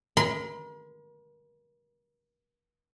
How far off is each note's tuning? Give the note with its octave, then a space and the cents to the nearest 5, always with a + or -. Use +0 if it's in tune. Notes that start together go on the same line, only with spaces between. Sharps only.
A#4 +40 C6 -45